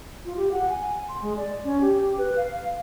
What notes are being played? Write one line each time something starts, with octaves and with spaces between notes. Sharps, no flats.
F4
G4
F#5
G#5
C6
G#3
D5
C#4
G4
B4
F5